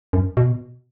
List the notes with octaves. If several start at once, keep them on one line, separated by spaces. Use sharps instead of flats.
F#2
B2